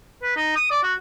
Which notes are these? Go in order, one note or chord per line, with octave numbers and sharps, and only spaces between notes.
B4
D#4
D#6
D5
F#4